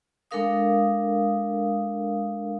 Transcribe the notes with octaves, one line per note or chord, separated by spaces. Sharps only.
G#3 D4 A4 A#4 F5 D#6